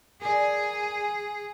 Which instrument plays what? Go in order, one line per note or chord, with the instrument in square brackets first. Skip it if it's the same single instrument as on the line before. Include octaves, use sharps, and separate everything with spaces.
[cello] G#4 [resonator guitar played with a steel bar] A#4 D5 [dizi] G#5